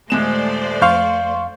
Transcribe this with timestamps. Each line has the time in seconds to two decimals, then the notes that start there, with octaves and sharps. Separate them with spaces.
0.10 D#1 G#3 A3 C5 D5 E7
0.82 F2 F5 C6 C#6 G6